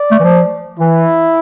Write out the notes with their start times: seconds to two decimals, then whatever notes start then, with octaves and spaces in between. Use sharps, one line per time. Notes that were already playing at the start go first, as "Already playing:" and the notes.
Already playing: D5
0.11 A3
0.20 E3
0.24 F3
0.79 E3 E4